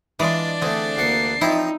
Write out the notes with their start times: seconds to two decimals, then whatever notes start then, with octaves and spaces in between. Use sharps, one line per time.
0.19 E3 G#3 D4 F4 G#4 D5
0.61 D3 A3 C4 G#4
0.97 D2 A#3 F#5 C7
1.41 F3 C4 D#4 E4 D#5